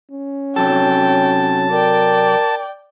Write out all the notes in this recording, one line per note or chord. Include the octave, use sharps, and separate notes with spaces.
C#4
C3 F#3 A4 G5 A5
A#4 D5 G5